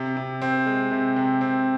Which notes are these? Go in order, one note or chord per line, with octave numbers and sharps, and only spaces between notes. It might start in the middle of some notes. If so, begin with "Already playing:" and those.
Already playing: C3
C3
C4
G#3
C3
C3
C4